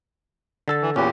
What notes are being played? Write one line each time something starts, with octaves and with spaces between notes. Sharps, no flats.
D3 A4 A5
E3
E2 A#2 C#4 G4 B4